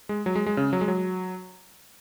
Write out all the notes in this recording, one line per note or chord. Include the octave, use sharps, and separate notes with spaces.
G#3
F#3
G#3
G#3
C#3
F#3
G#3
F#3